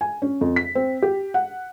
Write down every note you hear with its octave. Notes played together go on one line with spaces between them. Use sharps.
G#5
C#4
F2
B6
C4
G4
F#5